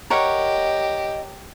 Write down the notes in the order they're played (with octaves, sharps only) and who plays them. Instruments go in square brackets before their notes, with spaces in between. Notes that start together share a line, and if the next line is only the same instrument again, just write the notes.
[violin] G4 [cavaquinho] A#4 C#5 F#5 [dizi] D#5